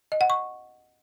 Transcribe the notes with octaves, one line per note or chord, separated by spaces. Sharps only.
D#5
F#5
C#6